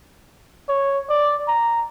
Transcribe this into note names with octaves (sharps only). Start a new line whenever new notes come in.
C#5
D5
A#5